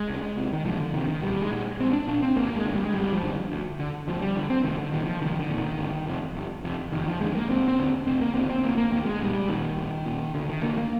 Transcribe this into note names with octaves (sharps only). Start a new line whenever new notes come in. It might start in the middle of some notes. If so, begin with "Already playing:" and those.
Already playing: G#3
C2
C3
D#3
C2 F3
D3
C3 D#3
D#3
A#1 G3
G#3
A#2
A#1 C4
D4
A#2 D4
C4
G#1 A#3
G#3
G2 D3
G3
G#3
G#1 G3
F3
G2 D3
D2
D3
D2 F3
G3
D3
C4
C2 D#3
D3
A#2 D#3
F3
C2 D#3
D3
A#2
D#3
G1
F2 C3
G1
F2 C3
F1 D#3
F3
D#2 D3 G#3
A#3
F1 C4
C4
D#2 D3
F1 C4
A#3
D#2 D3 C4
C4
F1 A#3
A#3
D#2 D3 A#3
G#3
A#1 G3
A#2 D#3
A#1
A#2
D2 D3
D#3
D3 A#3
A#3